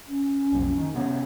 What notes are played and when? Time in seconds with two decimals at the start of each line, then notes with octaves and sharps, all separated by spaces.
0.08 C#4
0.52 B1 F2
0.77 D#3
0.94 C3 B3 C#4